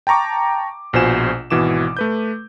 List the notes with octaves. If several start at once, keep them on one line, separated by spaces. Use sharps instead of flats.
G5 A5 A#5 C#6 D6
A#1 B2 F4 C5 G#5 E7
G#1 B2 E3 D6 E7
A3 B4 G6